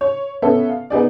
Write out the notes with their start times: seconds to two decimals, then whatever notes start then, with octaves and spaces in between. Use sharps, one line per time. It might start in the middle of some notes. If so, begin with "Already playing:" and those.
0.01 C#5
0.42 B3 C#4 A4 E5
0.69 F5
0.90 B3 D#4 G#4 D5